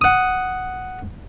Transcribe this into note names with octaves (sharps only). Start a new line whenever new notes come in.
F#5 D#6